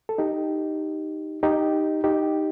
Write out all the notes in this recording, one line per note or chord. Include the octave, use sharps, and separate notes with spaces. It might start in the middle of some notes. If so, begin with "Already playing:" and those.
A4
D#4 G4
D#4 G4
D#4 G4